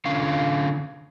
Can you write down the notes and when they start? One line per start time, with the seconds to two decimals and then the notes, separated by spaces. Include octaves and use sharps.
0.05 D3 C#4 F4 F5